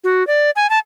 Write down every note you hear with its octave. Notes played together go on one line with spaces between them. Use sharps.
F#4
D5
G#5
A5